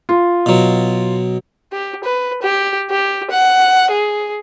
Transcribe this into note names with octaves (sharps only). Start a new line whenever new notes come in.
F4
B2 F#3
G4
B4
G4
G4
F#5
G#4